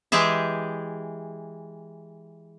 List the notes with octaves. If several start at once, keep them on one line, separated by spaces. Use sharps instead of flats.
E3 G#3 G4 G#4 E5